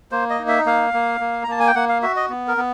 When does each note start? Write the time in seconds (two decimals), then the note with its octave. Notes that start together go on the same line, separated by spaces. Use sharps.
0.12 A#3 C5
0.30 D#5
0.39 D#4
0.48 E5
0.66 A#3 F5
0.94 A#3
1.20 A#3
1.44 A#5
1.48 A#3 A5
1.60 G#5
1.67 G5
1.75 A#3 F#5
1.89 F5
2.02 F#4 E5
2.16 D#5
2.29 B3
2.48 A#4
2.57 B3